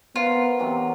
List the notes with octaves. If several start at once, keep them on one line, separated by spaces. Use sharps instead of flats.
B3 F4 A#4 C5 F#5
C3 E3 F#3